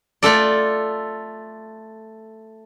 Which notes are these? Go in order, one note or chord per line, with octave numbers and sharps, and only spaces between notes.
A3 F4 A4 D5